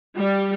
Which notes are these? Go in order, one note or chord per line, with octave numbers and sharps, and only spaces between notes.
G3